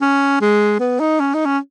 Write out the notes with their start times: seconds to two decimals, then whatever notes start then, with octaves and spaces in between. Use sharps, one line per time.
0.01 C#4
0.41 G#3
0.80 B3
1.00 D#4
1.20 C#4
1.34 D#4
1.46 C#4